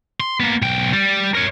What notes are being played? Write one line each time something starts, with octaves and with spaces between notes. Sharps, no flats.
C6
A#3 B3
B1 G5
G3
A#4 C#5